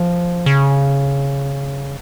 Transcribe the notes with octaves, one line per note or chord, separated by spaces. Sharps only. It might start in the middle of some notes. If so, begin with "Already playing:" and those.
Already playing: F3
C#3